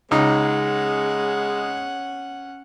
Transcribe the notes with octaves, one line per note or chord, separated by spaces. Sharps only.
C#2 G#3 C#4 D#4 F#5